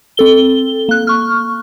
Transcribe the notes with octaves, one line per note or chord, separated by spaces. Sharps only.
C4 A4 G7
A#3 F#6
C#6 F6